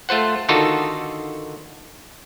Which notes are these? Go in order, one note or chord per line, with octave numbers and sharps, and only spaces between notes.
A3 F4 C5 F#5
D3 D#3 D#4 F4 F#4 A4